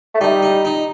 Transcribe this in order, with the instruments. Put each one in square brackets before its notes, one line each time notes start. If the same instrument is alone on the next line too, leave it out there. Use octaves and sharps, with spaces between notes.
[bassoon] A3
[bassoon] G3 [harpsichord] D#4
[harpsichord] D#4
D#4